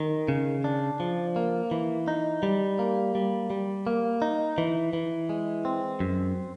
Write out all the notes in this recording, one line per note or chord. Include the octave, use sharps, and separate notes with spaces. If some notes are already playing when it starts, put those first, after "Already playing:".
Already playing: D#3
C#3
D4
F3
A#3
E3
D#4
G3
A#3
G3
G3
A#3
D#4
E3
E3
G#3
C4
F#2